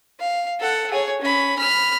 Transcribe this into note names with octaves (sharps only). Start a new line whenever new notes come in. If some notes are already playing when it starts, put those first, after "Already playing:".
F5
A4 F#5
G#4 C#5
C#4 B5
B5 F6